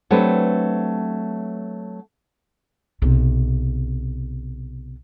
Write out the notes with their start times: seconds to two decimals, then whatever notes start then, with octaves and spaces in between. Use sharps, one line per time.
0.11 F#3 A3 C4 D4 G4 B4
3.02 B1 C3